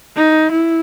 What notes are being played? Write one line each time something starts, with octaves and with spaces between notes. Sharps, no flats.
D#4
E4